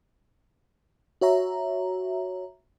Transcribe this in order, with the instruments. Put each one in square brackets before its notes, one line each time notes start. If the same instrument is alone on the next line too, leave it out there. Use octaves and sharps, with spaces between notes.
[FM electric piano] F#4 C#5 E5 A#5